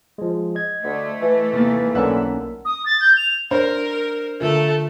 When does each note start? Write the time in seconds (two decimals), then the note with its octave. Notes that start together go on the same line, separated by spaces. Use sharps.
0.18 F3 G#3
0.55 D#5 G#6
0.84 D2 D3 A3
1.21 E3
1.53 D#2 C3 A#3 A6
1.95 B1 D3 E3 C#4 A4 A#4 E5 F#5
2.65 D#6
2.86 A6
3.01 G6
3.17 F7
3.51 D4 A#4 C5
4.41 D3 A3 F4 A4 A#4